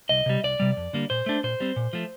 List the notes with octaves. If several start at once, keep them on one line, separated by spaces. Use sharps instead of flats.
C2 D#5
C3 G3
C2 D5
C3 G3
F2
D3 G3 A#3
A#2 C5
A3 D4
A#2 C5
G3 C4
A#2
F3 A3